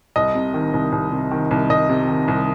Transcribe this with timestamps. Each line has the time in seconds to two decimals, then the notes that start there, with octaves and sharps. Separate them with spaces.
0.16 C2 D#5
0.35 C3
0.54 D#3
0.74 C2
0.92 C2
1.11 C3
1.31 D#3
1.51 C2
1.69 C2 D#5
1.89 C3
2.08 D#3
2.28 C2